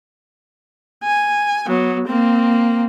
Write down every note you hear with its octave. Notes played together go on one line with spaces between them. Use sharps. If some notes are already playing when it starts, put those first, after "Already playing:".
G#5
F#3 B3
A#3 C4